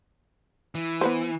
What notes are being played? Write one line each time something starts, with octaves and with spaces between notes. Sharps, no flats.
E3
B3 B4 C5